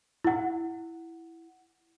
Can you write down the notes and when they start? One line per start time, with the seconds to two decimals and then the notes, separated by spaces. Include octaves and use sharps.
0.24 E4 F#5